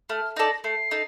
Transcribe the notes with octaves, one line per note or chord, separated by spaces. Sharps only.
A3 F6
D#4 A4 D5 A#6
A3 C7
D#4 A4